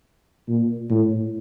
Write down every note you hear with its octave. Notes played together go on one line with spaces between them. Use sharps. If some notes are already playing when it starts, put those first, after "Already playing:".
A#2
A2